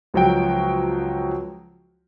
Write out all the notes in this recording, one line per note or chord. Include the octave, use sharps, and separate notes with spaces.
C#2 F3 F#3 F#4 G5 D7